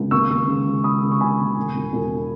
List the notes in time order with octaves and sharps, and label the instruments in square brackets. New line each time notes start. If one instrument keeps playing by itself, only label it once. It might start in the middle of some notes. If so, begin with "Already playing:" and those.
Already playing: [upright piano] C#2
D#2 C#6 E6
D#2
C#3
C#3
C#3 B5 D#6
C#3
C#6
C#3 G#5 B5
D#2
E1
E1
E1